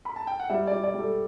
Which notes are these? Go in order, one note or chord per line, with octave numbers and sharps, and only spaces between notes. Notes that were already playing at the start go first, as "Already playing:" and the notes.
B5
A5
G5
F#5
G3 E5
D5
G3
D5
G3
A4